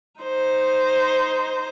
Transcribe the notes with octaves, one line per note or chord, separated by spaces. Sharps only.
D#4 C5